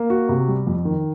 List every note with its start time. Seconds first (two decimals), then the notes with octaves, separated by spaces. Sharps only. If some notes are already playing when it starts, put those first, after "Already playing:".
Already playing: A#3
0.10 F#4
0.29 C3
0.48 G3
0.67 F2
0.85 D#3